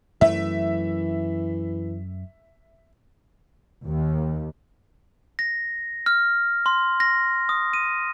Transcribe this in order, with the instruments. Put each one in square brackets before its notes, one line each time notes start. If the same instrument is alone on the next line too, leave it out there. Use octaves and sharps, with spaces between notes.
[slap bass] F#2 A3 [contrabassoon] E3 [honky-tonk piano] E5
[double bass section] D#2
[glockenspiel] A#6
F6
C6
A#6
D#6
D#7